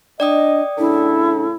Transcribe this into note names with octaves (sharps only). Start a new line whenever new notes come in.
D4 D5 D#5 G5 D#6
A2 C#3 D4 E4 A4